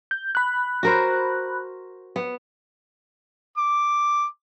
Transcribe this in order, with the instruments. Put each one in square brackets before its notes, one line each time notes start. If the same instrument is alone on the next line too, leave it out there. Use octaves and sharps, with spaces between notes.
[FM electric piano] G6
B5 F#6
[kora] F#4 A#4 C5
B3
[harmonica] D6